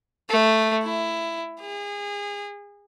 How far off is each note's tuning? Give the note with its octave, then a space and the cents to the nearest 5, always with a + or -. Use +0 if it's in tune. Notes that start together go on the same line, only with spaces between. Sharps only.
A3 +0
E4 +15
G#4 -30